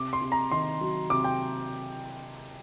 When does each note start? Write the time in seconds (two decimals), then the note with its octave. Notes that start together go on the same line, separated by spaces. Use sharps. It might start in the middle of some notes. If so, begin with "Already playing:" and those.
Already playing: C3 D6
0.13 C6
0.22 C3
0.32 A#5
0.51 D#3 C6
0.81 F#3
1.10 C3 D6
1.24 G5